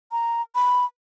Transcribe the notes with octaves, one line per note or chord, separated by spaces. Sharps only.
A#5
B5